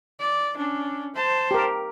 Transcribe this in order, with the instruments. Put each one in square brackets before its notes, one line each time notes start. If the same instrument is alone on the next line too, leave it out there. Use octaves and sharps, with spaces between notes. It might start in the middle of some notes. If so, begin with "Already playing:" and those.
[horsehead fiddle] D5
C#4 D4
C5 A5
[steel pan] G4 A#4